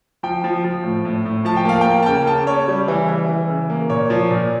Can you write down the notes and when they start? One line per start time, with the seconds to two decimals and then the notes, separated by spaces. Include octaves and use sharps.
0.23 F3 G5
0.44 F3
0.64 F3
0.83 A2
1.05 A2
1.25 A2
1.45 F3 A5
1.57 G5
1.65 A#3 F5
1.81 A#3 G5
2.03 A5
2.06 C#3 G5
2.26 C#3 A5
2.47 C#3 C#5
2.68 G3
2.88 E3
3.09 E3
3.29 E3
3.49 C#3
3.70 A#3
3.90 A#2 C#5
4.10 F3
4.31 A#2